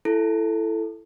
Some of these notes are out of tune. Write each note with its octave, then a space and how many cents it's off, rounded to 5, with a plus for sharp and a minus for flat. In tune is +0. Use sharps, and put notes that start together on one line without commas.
E4 +15 A4 +0